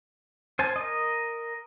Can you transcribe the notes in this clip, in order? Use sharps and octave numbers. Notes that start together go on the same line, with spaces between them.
C5 G#5 A5
A#4 D#5